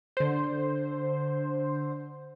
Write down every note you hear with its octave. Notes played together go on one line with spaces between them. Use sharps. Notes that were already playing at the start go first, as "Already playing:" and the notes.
D3 C5